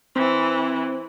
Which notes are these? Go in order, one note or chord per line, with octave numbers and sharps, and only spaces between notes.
E3 C4